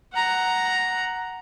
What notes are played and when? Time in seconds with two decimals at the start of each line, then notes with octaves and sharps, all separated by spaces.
0.13 F#5 A#5